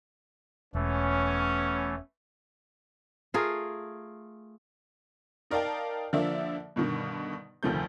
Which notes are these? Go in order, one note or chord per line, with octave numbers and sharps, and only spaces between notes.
E1 E3 A3 B3 C#4
A3 F4 G#4 A#4
D#4 A#4 D5 F5 G5 A5
D3 F3 A#3 D5 E5
G2 B2 D3 D#3
F1 D2 D#3 F3 A3 G6